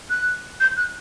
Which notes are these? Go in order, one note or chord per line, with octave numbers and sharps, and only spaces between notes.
F#6
G6
F#6